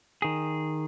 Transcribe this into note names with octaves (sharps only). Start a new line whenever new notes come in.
D#3 G#4